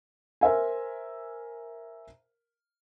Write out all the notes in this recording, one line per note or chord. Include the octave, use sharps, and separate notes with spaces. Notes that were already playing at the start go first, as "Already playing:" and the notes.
A#4 C5 E5 G#5